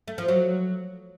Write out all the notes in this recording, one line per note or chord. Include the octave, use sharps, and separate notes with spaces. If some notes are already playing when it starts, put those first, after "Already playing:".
A3
F3
F#3